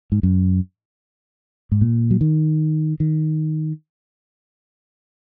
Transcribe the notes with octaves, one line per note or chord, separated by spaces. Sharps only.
G#2
F#2
G#2
A#2
F#3
D#3
D#3